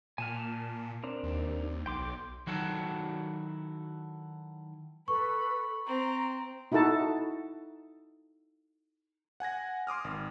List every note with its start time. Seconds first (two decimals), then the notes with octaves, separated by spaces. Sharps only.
0.18 A#2 G#5 A5 F6
1.04 C4 D4 A#4
1.23 D#2
1.86 B1 G5 C6 D6
2.47 D#3 F#3 E4 F#4 A4
5.08 A4 B4 B5 C#6
5.86 C4 A#5
6.72 D#4 E4 F#4 A4 A5
9.40 F#5 G#5 G#6 A#6
9.87 C6 D6 D#6 F6
10.04 G#1